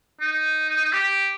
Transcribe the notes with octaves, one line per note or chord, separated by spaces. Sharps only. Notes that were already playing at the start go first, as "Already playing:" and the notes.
D#4
G4